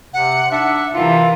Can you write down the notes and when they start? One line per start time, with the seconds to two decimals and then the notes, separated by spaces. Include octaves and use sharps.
0.13 C3 F#5
0.52 D4 D#4 E5 F#5
0.95 C3 E3 F4 A#4